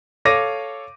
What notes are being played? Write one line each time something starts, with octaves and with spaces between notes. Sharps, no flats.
A4 C#5 F5 D6 A#6 D#7